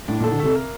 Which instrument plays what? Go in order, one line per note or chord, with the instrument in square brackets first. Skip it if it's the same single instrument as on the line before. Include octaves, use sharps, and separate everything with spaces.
[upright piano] A2 [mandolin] D4
[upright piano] A#2
[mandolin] A4
[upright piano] D3
[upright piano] C3 [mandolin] A3
[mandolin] A#3